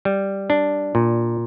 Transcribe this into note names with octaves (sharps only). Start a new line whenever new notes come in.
G3
D4
A#2